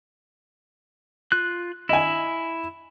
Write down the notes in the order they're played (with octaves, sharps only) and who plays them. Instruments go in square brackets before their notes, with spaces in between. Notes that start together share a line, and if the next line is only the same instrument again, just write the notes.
[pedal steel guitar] F4 F#6
[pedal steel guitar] E4 [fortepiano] D#5 G#5